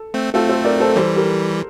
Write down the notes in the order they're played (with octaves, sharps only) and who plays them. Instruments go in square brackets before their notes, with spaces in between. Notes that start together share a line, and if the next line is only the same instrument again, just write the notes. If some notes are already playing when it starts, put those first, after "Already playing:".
Already playing: [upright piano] A4
[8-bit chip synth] A3 C4
[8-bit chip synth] A3 C4 [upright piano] F4 A4
[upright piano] A4 C5
A#4 D5
A4 C5
[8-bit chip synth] E3 G3 [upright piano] A4 C5
[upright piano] G4 A#4